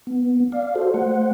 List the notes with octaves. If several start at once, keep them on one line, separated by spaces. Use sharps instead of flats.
B3
D5 F5
F#4 A4 C5
A3 C5 F#5